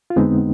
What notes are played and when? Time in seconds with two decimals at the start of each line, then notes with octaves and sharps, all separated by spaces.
0.10 F4
0.16 F2 D3 G#3 B3 C4 D#4